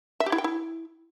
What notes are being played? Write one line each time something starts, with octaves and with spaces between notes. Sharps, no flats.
E5
G4
E4
G5
E4